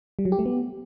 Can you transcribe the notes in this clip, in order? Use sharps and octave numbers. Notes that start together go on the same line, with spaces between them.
G3
F#3
G4
A3
B3